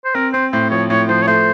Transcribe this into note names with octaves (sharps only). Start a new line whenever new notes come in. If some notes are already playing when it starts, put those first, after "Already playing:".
C5
C4 A#4
C4 C5
A2 C5
F3 C#5
A2 C#5
F3 C5
C#5
A3 C5